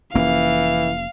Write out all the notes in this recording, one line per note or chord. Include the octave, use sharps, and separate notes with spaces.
F1 E3 A#3 C#4 F5